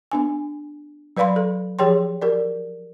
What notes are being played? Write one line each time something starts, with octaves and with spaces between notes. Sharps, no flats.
B3 D4 G#5
F#3 B4 D5 F5 B5 C6
A4
F3 G4 G#4 C#5 G5 C6
G4 A#4 D5